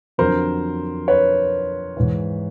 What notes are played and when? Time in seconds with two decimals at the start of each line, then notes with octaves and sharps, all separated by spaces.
0.18 F2 D3 F#3 A#4 C5
1.08 B4 C#5
1.97 G#2 E3